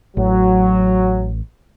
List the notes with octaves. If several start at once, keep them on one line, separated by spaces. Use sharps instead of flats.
A1 F#3